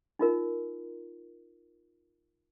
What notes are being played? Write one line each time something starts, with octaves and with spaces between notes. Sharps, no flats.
D#4 F4 A#4